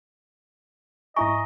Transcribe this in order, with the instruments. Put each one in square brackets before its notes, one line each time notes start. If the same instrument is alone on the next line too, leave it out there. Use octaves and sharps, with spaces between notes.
[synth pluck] G#2 E4 A#5 [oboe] D#5 [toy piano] E5 G#5 C#6